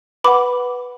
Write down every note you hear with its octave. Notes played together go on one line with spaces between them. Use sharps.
B4 F#5 B5 D6